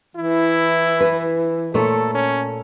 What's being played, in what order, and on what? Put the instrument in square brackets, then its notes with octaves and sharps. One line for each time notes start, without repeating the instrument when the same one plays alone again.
[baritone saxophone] E3 [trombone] E4
[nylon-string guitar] B4
[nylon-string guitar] A#2 A3 C#5 [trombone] A4
[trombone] C#4